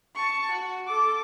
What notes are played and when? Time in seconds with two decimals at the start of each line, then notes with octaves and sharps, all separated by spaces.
0.15 A5 C#6
0.51 F#4
0.87 A4 D6